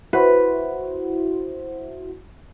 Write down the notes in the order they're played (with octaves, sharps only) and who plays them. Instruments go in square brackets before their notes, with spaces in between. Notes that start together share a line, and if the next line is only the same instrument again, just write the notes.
[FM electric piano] E4 F#4 C5 [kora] B4